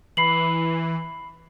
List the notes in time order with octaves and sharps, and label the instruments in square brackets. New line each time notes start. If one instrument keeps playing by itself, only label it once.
[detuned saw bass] E3 [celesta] B5 C7 F#7